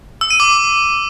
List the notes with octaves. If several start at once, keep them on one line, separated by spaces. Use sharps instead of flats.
E6
D#7
D6